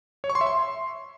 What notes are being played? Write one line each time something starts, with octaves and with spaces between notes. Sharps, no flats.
C#5
C#6
C6
E5
C6